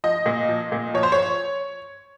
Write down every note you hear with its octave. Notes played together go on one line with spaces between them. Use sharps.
F3 D#5
A#2
F3
A#2
F3 C#5
C5
C#5